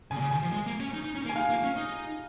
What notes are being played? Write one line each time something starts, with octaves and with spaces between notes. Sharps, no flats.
C#3 G#5
A#2
C#3
D#3 G#5
F3
G#3
A#3
C#4
D#4
D#4
C#4
A#3
G#5
D#4 F5
A#3
C#4
D#4